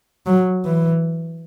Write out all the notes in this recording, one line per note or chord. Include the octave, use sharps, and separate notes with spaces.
F#3
E3